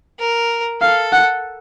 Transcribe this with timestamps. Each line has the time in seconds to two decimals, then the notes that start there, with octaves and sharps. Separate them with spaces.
0.20 A#4
0.81 A4 F5
1.13 F#5